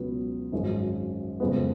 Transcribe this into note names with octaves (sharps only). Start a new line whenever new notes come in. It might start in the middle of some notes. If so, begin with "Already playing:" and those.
Already playing: C#2 B2 F#3 B3
G#1 F#2 F3 G#3
F#1 F2 F3 G#3 B3